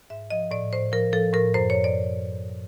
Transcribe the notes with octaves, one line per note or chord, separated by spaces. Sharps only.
G#2 E5
F3 D#5
A2 D5
A2 C5
F3 A#4
F3 A4
A2 A#4
F#2 C5
C#5
F#2
D5